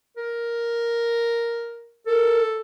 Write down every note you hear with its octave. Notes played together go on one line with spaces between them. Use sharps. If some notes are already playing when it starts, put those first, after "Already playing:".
A#4
A4 A#4